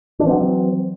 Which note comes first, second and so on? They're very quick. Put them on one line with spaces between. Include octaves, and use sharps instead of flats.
D4 E3 C4 F#3